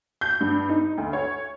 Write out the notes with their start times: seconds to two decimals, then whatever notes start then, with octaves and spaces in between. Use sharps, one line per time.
0.21 G6
0.40 G2
0.69 D#4
0.98 D2
1.13 C#5